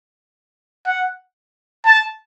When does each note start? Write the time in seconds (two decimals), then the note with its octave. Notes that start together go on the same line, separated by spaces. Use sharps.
0.86 F#5
1.85 A5